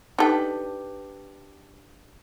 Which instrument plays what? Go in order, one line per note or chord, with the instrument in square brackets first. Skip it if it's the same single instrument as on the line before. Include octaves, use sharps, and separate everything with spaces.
[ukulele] D4 G4 B4 [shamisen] D#4 A4 G5